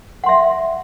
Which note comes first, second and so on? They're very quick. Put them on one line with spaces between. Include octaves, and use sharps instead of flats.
F#5 C6 E5